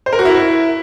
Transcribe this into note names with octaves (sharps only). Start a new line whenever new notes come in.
C5
A#4
F#4
E4